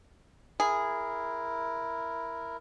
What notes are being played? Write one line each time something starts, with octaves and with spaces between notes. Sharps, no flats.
E4 G#4 A#4